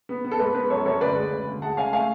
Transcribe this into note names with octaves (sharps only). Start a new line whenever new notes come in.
B3
B3
A4
G#2 B4
B3 B4
F#2 A4 C#5
F#2 A4 C#5
D2 B4 D5
G#3
C#3
D2
G#3 F#5 A5
C#3 F5 G#5
A3 F5 G#5